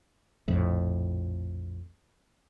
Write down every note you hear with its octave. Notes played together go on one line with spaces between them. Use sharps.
A#1 F2 A2